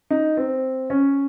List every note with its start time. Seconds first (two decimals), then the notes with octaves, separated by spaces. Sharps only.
0.10 D#4
0.37 C4
0.90 C#4